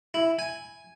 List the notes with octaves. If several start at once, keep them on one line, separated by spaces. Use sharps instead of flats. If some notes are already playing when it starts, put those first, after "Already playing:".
E4
G#5